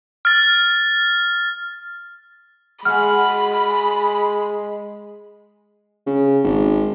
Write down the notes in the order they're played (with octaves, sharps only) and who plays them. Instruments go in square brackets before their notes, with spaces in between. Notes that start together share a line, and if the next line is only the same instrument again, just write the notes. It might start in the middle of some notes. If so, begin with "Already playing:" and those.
[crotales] F6 A6
[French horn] G#3 [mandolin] F#4 G#4 [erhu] B5 [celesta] F6
[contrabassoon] C#3
G#1